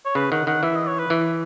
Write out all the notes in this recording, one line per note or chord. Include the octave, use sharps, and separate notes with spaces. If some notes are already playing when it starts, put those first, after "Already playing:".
C#5
C#3 B4
D#3 F#5
D#3 F#5
E3 E5
D#5
C#5
B4
E3